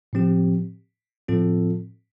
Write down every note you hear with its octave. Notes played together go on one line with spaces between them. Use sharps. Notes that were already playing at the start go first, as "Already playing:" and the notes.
A2 F3 C4 G4
A2 F3 C4 F4 A4